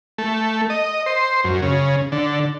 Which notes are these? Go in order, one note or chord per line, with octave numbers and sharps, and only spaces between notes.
A3
D#5
C5
F#2
C#3
D3